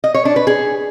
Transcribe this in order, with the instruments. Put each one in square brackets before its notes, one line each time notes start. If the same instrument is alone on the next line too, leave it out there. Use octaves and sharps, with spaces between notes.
[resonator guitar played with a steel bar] D#5
C#5
D4
B4
G#4